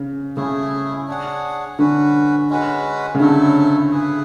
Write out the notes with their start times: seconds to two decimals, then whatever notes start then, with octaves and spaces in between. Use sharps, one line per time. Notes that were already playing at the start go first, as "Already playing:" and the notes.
Already playing: C#3
0.37 C#3 A3 E4 G#4
1.08 D4 G#4 C#5 F#5
1.79 D3 C#4 F#4 B4
2.50 G#3 C#4 F#4 B4
3.15 C#3
3.20 D3 F#3 A3 E4 A4
3.91 E4 G#4 B4